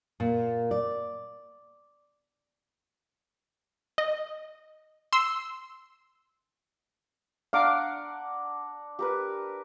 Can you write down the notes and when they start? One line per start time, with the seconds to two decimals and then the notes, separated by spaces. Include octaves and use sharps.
0.20 A#2
0.71 D5
3.98 D#5
5.13 C6 E6
7.53 D4 F5 F#5 A#5 D6
8.99 G4 A#4 B4